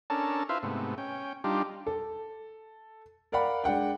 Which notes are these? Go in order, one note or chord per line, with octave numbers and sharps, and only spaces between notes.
C#4 D4 A4 A#4 A5
E4 F4 B4 C5 E5 F5
G#2 C3 A3 B3
C#4 G5
G3 D4 D#4 F4 G4
A4
A#4 D5 F5 F#5 B5
G#3 D4 F#5 G5